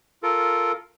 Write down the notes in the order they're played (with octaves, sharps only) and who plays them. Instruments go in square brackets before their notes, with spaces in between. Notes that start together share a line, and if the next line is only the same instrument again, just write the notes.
[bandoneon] F4 A4 A#4